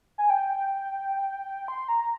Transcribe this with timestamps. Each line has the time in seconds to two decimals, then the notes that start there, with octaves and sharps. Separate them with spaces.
0.18 G#5
0.30 G5
1.68 C6
1.88 A#5